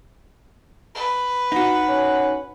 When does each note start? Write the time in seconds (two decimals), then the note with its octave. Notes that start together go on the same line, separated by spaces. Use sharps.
0.95 B4
1.52 D#4 F#4 F#5
1.88 C#4